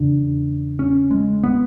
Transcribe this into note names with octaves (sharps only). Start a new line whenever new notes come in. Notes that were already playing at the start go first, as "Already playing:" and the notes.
Already playing: E2 C#3 D4
C#4
G#3
B3